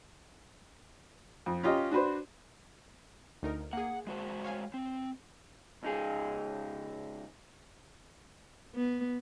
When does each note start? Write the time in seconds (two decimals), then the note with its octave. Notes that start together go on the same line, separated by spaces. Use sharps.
1.46 F2
1.63 C#4 F4 G4 D#5
1.91 D4 F#4 B4 C5
3.43 D2 D#4 A#4
3.73 A#3 G#4 F#5
4.07 G#3 F#4 C5
4.44 C#5 F5 G#5
4.74 C4
5.83 C#2 D#4 G#4
8.75 B3